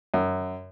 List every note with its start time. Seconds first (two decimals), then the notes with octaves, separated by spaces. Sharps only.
0.14 F#2